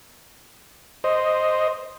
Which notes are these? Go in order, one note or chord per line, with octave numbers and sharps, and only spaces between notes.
C5 D#5